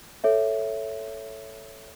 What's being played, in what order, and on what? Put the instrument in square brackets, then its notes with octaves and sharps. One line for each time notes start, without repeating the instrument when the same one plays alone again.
[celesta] A4 C#5 E5